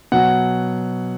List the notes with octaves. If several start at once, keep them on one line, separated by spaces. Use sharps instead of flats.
B2 F#3 F#5